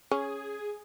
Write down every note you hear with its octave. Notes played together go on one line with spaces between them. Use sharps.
C#4 G#4